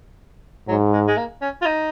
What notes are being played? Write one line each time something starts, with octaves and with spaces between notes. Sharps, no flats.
G#2 F#3
G#3
G#3
A#3
C#4
F4
D#4